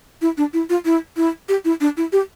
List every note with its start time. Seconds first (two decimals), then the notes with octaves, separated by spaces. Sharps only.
0.21 E4
0.37 D4
0.53 E4
0.70 F4
0.85 E4
1.17 E4
1.49 G4
1.65 E4
1.81 D4
1.97 E4
2.12 G4